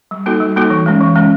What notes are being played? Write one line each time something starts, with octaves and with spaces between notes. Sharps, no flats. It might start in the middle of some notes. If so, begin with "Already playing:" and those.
G3
A#3 D#4 F#4 A4
G3
A#3 D#4 F#4 A4
E3
G#3 C#4
E3
G#3 C#4